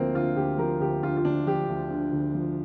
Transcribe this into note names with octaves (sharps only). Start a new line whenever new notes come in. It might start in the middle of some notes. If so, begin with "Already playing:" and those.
Already playing: D2 F3 A#3 C4
D3 F4
D2 G4
F3 A#4
D2 G4
D3 F4
F4
D2 D4
F3 G4
D2
D3
D2
F3